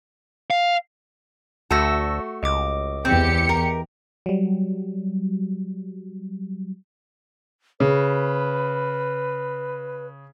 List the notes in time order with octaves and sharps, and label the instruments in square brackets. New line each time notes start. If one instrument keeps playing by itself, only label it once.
[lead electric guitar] F5
[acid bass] D2 [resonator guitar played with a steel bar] A3 F#4 [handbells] A5 E6 A#6
[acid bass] C#2 [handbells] D#5 D6
[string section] E2 G4 C#7 [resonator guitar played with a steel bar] C4
[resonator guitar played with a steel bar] A#4
[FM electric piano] F#3 G3
[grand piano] C#3 [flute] B4